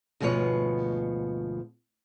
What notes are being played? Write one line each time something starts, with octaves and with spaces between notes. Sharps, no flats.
D2 G#2 B2 F3 B3 C#5